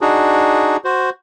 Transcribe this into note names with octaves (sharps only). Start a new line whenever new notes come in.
D4 D#4 F#4 G#4
F#4 C5